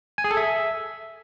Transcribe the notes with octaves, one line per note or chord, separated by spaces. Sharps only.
G#5
G#4
A4
E5